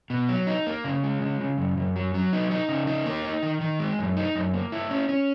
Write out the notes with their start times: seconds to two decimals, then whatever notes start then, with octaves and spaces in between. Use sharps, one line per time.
0.10 B2
0.29 F#3
0.47 D#4
0.67 A#3
0.84 C#3
1.04 G#3
1.21 C#3
1.40 C#3
1.58 F#2
1.77 F#2
1.96 F#3
2.14 F#3
2.33 D#4
2.51 D#4
2.69 C#3
2.87 D#4
3.06 A#3
3.24 D#4
3.43 D#3
3.61 D#3
3.79 G#3
3.99 F#2
4.17 D#4
4.35 F#2
4.54 A#3
4.72 E4
4.90 C#4
5.09 C#4